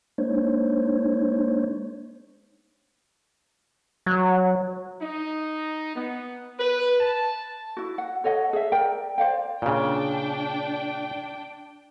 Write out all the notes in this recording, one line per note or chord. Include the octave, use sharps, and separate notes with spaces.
G#3 A#3 D4 D#4 C5 C#5
F#3
D#4
B3
B4
A5
E4 F#4
F#5
A4 C#5 D#5 F#5
G#4 E5
A#4 D5 G5
C5 D5 F5 G5
A#2 C#3 D4 G5